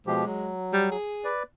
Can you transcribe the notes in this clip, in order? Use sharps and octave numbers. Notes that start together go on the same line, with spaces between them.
B2 F3 G#3 G4
F#3
G3
G#4
B4 D5